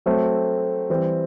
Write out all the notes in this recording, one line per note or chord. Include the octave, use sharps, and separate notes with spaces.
F#3 A3 C4
E3 G3 C4